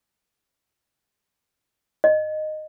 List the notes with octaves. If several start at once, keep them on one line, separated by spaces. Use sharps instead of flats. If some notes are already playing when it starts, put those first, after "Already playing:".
D#5